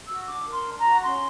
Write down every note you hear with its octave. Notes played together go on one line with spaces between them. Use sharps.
F#4 E6
D4 D6
A#4
C6
D4
A#5
F#4
C#4 C6